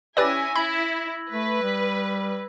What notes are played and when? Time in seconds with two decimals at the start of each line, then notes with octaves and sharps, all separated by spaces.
0.17 C#4 E4 G4 B4 D5 G#5 E6 A#6
0.56 E4 B5 G#6 F#7
1.31 A3 B4
1.62 G3